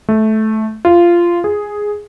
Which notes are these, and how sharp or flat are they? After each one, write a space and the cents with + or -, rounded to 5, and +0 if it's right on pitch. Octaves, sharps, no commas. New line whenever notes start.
A3 -15
F4 -15
G#4 +0